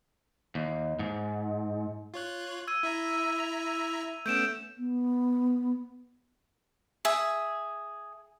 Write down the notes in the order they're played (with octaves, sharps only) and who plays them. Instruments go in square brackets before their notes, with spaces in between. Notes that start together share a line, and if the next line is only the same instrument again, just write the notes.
[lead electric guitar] D#2
G#2
[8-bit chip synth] F4 C#5 F#6
[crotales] E6 G#6 D#7
[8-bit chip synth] E4 E5 A#5
[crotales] F7
[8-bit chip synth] A3 B3 C#4 [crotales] G6 D7 E7
[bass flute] B3
[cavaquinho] G#4 E5